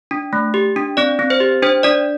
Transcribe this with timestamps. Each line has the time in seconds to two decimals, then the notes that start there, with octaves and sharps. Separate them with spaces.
0.11 D4
0.33 A3
0.54 G4
0.76 D4
0.97 C4 D5
1.19 C4
1.30 C5
1.40 G4
1.62 D4 C5
1.83 D4 D5